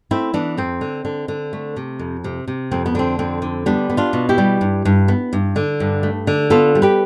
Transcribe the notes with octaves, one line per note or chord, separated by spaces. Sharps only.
A3 C4 E4
E3 B3 D4
F2 C4
D3
D3
D3
A3
C3
F2
C3
C3
F2 C4
B3
D3 C4
F2 C4
D3
G3 B3 D4
B3
D4 F4
B2
E4 G4
G3
G2
G2
B3
G2
D3
G2
A3
D3
B3 F4 A4
G3
G4 B4